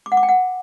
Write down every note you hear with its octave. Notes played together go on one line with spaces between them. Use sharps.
D6
F#5
D6
G5
F#5